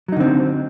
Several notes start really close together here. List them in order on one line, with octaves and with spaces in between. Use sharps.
F#3 D#4 D3 C4